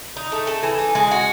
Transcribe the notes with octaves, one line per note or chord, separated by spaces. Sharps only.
D#4
A3
A4
E3
D#4
G#3
F#4